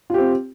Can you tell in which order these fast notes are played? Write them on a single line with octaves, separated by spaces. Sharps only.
F4 G4 C4